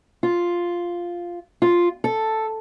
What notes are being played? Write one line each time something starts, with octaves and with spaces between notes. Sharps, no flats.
F4
F4
A4